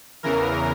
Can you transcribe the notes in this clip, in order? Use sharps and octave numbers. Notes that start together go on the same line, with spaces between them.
E2 C#3 E3 A#4